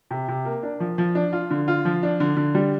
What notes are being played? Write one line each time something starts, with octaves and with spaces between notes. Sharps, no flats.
C3
C3
A#3
D4
F3
F3
D4
F4
D3
F4
F3
D4
D3
D3
G3